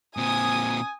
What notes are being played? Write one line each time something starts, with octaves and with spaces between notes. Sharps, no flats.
A#2 C4 G#5 D#6